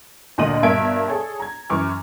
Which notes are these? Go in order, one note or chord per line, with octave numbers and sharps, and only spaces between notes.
D2 A#2 D3 D#5 D#7 F#7
G2 B2 A#3 E5 G#6 D7
G#4 A4 C#5
A#5 G#6
F#2 E3 C#6 D6 F6